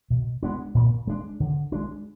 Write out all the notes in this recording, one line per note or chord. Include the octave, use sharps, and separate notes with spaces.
B2
G#3 B3 D4
A#2
G#3 D4
D3
G#3 D4